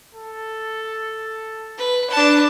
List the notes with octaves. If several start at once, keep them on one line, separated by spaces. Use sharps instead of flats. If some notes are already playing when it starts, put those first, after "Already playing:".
A4
B4
D4 B4 A5